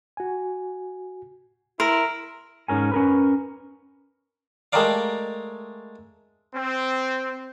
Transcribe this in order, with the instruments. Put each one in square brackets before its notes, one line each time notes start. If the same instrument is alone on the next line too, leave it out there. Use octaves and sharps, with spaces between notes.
[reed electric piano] F#4 G#5
[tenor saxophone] E4 [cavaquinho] A#4 [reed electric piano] C6
[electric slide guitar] G#2 C#4 A#4 G#5
C#4 A#4 B4
[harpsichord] G#3 A3 G4 A#4 D5 F5
[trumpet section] C4